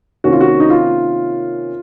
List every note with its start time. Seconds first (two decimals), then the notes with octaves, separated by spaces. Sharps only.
0.24 C3 D#3 A#3 C#4 F#4
0.32 F4
0.41 F#4
0.60 D#4
0.70 F4